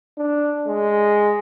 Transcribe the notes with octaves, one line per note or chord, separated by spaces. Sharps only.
D4
G#3